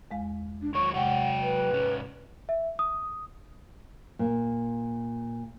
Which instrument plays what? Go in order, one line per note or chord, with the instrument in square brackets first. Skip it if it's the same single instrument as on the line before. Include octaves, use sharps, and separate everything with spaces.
[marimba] E2 G#3 F5
[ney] D4
[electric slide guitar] D#3 F#3 C#5 [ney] C#6
[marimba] C3 G#3 [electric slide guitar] F#3 C#5 G5 [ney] F#5
[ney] B4
[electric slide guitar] G#2 C#4
[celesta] E5
D#6
[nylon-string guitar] A#2